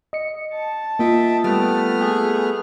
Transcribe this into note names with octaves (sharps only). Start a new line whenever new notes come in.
D#5 C#7
A5
A#3 F4 D#5 E5 G5
G3 A3 B3 F6
G#4